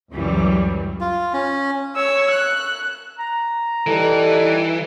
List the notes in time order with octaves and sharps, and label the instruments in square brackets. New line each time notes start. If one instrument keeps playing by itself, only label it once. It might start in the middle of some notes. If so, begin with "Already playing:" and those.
[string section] C#2 F#2 E3 F#3 G3
[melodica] F4
C#4
[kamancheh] C#5 E6
F#6
[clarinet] A#5
[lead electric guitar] E3 [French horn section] G3 D#4 A4